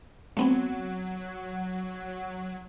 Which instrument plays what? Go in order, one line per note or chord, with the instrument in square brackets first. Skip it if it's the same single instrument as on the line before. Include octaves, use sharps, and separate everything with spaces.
[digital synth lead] F#3 [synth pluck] A3 B3 C4